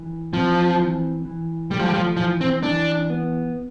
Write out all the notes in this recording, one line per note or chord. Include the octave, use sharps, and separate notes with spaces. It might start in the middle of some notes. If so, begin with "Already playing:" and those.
Already playing: E3
F3 C4
E3
E3
G3 A3
F3
G3
F3
E3 F3
C4
E3 D4
B3